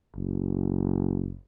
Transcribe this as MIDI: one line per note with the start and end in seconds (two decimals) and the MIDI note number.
0.16 1.38 30